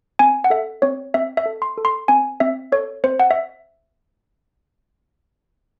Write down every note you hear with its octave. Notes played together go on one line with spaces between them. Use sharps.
C4 G#5
F#5
A4 E5
C4 C#5
C4 E5
E5
A4
C6
A4
C6
C4 G#5
C4 E5
A4 C#5
C4 C5
F#5
E5